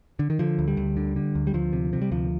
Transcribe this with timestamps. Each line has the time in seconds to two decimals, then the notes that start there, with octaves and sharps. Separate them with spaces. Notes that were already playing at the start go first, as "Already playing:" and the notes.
0.19 D3
0.30 D#3
0.39 D3 F3
0.59 D2
0.68 G3
0.77 D2
0.97 D3
1.16 D3
1.35 D2
1.47 G3
1.54 D2 F3
1.73 C3
1.93 C3
2.02 G3
2.11 D2 F3